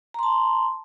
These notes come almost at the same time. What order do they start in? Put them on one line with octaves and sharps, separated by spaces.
A#5 C6 A5